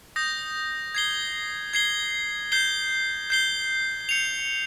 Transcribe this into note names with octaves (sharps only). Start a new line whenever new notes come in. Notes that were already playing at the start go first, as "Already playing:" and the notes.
D#6 G6 A#6
G#6 C7 G7
G#6 C7 G7
G6 C7 G7
G6 C7 G7
G6 C#7 F7